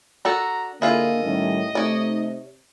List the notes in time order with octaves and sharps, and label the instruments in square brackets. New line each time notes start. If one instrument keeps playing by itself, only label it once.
[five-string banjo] D4 F#4 A4 [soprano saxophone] A#5
[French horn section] D3 [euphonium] A#3 [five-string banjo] E4 F4 G#4 [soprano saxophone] D#5
[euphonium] A2 [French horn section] D#3 G3 C#4
[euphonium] C3 [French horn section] A3 D#4 [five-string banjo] C#5 D5